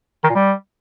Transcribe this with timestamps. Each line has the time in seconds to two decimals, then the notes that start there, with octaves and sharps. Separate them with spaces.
0.24 D#3
0.30 A#2
0.35 G3